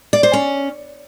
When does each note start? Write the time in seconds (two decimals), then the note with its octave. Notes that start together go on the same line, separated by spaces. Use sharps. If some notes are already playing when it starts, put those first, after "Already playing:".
0.13 D5
0.23 C5
0.33 C#4